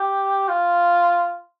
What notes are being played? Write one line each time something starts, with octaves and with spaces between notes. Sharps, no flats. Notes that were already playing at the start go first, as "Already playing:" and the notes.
Already playing: G4
F4